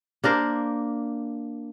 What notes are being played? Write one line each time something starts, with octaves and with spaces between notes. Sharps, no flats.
A#3 D4 A#4 C5